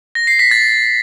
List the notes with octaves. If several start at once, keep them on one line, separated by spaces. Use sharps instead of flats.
A#6
C7
B6
A6